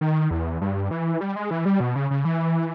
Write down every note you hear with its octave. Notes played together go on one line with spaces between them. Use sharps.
D#3
E2
G2
E3
G3
G#3
E3
G3
B2
C#3
C#3
E3